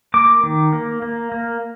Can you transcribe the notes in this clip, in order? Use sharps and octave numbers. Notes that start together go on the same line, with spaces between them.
A#3 D6
D#3
A#3
A#3
A#3